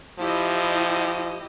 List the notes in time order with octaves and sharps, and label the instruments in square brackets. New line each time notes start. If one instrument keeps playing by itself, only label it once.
[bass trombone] F3 [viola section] E4 G4 D#5